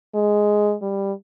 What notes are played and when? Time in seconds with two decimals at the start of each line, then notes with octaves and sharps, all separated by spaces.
0.14 G#3
0.82 G3